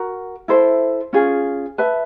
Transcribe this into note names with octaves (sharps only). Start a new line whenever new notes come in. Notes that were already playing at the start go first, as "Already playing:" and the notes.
Already playing: F#4 A#4
E4 A4 C5 E5
C#4 F4 G#4
B4 E5 A5